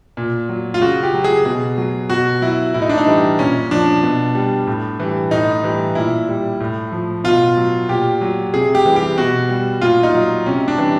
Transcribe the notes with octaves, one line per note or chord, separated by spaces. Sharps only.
A#2
F#3
F4
C#3 F#4
G4
F#3
G#4
B2 G#4
F#3
B2 F#4
F#3 E4
A2 E4
D#4
D4
D#4
E3 G3
A#2 C#4
F3 D4
B2
G3
A2
E3 G3
A2 D#4
E3 G3
A#2 E4
G3
A2
F3
B2 F4
F#3
A#2 G4
F#3
C3 G#4
G4
E3 G3
G4
B2 F#4
G3
A#2 F4
D#4
F#3
C3 C#4
D4
E3 G3